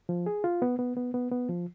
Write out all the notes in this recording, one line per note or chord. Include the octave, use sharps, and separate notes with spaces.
F3
G#4
F4
B3
B3
B3
B3
B3
F3